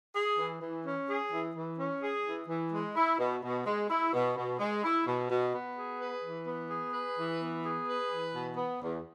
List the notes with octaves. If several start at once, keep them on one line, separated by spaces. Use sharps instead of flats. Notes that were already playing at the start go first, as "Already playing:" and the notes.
G#4
E3
E3
C#4
G#4
E3
E3
C#4
G#4
E3
E3
G#3
E4
B2
B2
G#3
E4
B2
B2
G#3
E4
B2
B2
B3
G#4
B4
E3
B3
G#4
B4
E3
B3
G#4
B4
E3
B2
B3
E2